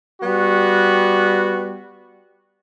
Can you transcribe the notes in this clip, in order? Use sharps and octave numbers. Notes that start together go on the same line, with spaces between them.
G3 B3 F#4